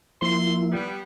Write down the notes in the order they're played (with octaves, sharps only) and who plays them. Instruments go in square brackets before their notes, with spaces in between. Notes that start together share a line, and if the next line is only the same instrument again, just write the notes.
[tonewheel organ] F3 A#3 E4 [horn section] C6
[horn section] G3 B3